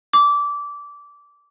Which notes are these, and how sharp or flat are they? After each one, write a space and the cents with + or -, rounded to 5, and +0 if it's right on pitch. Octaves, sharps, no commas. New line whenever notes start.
D6 -20